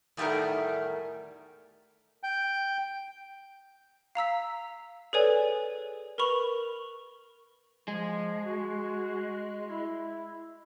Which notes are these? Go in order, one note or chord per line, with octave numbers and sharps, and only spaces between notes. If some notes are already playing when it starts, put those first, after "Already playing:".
E2 A2 D#3 G3 A3 A#4
G5
F5 A#5 E6 B6
G#4 A4 B4 C#5 D5 G#5
A#4 B4 B5 C#6 F7
F3 G#3
F#4
E4